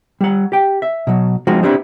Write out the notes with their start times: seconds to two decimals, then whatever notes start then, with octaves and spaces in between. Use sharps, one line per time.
0.21 G3 F#5
0.52 G4 G5
0.82 E5
1.07 B2 F#3
1.47 F3 G#3 C4 D#4 F4 F#4
1.63 B3 C4 D4 E4 G4 C5